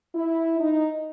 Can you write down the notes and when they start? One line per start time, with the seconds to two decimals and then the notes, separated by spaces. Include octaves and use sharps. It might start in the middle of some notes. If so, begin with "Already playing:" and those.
0.15 E4
0.60 D#4